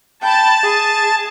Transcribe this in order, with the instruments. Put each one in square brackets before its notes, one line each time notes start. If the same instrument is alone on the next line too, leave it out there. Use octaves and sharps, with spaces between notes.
[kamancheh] G5 B5 [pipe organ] A5
[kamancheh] G#4